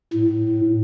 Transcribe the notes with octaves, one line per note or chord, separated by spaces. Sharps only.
A2